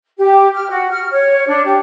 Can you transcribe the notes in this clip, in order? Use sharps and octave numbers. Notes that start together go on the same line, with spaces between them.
G4
F6
F#4
F6
C#5
D4
G4